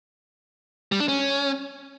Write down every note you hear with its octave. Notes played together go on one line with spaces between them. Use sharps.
G3
D4
C#4